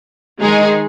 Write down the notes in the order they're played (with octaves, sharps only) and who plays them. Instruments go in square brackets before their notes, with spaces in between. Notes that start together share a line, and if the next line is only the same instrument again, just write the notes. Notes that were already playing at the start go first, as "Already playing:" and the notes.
[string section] D#3 G#3 D#4 G#4